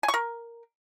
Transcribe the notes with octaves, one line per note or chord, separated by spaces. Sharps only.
G#5
C#6
A#4